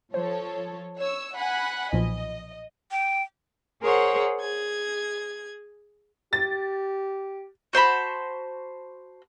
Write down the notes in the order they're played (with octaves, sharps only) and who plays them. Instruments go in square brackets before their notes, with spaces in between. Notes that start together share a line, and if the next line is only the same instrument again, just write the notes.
[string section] F3 A4 C#5 [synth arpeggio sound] C5
[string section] C#5 E6
F#5 G#5 B5
[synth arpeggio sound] B1 A#2 F3 [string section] D#5
[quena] G5
[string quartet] G#4 A#4 C5 C#5 F#5
G#4 G#6
[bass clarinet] G4 [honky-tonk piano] A6
[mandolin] F#4 C5 A5 B5